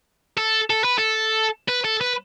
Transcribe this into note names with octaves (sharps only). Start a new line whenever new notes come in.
A4
A4
B4
A4
B4
A4
B4